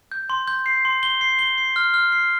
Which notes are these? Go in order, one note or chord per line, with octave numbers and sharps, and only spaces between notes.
G6
C6
G6
C7
C6
G7
C7
G7
C7
F6
F6
C7